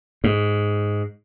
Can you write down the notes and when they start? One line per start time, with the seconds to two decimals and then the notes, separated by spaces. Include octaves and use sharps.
0.24 G#2